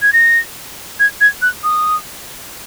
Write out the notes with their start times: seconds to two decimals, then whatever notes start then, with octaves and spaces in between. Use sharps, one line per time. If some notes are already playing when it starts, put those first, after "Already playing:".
0.02 G#6
0.13 A#6
1.00 G#6
1.21 G#6
1.42 F#6
1.64 D#6